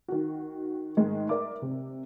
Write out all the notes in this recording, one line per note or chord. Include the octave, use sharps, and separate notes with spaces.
D#3 F#4
G#2 D#3 G#3
A#4 D5 E5 D6
C3